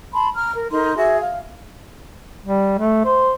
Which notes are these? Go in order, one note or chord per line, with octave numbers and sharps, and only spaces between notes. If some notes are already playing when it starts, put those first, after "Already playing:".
A5 B5 C6
A#5 F6
A#4
D#4 A4 A#4 C6
F#4 G#4 E5
F5
G3
A3
C5